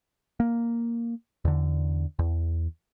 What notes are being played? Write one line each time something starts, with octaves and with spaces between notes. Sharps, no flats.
A#3
E2 D3
E2